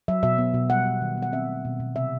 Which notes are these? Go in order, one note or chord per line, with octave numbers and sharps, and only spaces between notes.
F#3 E5
B2 E5
B3
B2
G3 F#5
B3
D#3
B3
F#5
C4 E5
A3
B2
B2
C3 E5